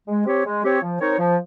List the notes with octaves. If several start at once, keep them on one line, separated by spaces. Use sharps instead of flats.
G#3
C4 G4 C#5
G#3
C4 G4 C#5
F3
C4 D#4 A#4 C#5
F3